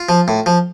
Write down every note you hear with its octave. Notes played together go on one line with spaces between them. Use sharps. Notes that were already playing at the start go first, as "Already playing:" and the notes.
Already playing: F4
F3
A2
F3